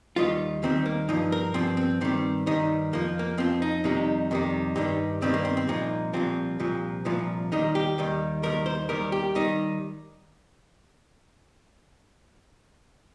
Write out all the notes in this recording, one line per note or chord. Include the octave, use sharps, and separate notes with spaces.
D#2 D#3 G3 F4
D#2 D#3 G3 C4
A#3
G2 F3 D#4
A#4
G2 F3 C4
C4
G2 D#3 G3 C4
G2 D#3 G3 D#4
F2 F3 A#3
A#3
F2 F3 C4
D#4
F2 C3 D#3 G3 D#4
F2 C3 D#3 G3
G2 D#3 G3 D#4
G2 D#3 G3 C4
A#3
C4
C4
C2 A#2 F3 D#4
C2 A#2 F3 C4
C2 A#2 F3
C2 A#2 F3
D#2 D#3 G3 D#4
G4
D#2 D#3 G3
D#2 D#3 G3 A#4
C5
D#2 D#3 G3 A#4
G4
D#3 G3 D#4